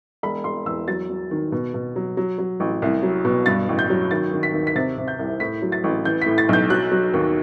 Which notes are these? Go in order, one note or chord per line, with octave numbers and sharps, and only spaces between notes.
E1 B5
E1 C6
E2 E6
F#3 A6
F#3
D#3
B2
B2
F#3
F#3
F#3
A1
C2
F#3
B2
G2 A6
A1
G6
F#3
D#3 A6
D#3
B6
D#2
B6
C3 A6
C3
G6
C2
A2 B6
F#3
A6
A1
E3 G6
B6
A2
A6
B1 G6
F#3 F#6
F#3
D#2